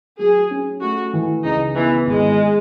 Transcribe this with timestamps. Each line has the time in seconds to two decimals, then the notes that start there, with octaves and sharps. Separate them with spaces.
0.18 F#3 G#4
0.51 C#4
0.81 A3 F#4
1.13 E3
1.44 C#2 D#4
1.76 E3 B3
2.07 G#1 G#3